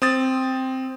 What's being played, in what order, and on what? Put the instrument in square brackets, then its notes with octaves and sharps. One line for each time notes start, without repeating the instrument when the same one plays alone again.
[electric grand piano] C4 D#6 A6